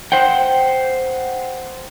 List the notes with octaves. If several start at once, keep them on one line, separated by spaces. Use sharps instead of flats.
C5 F#5 G5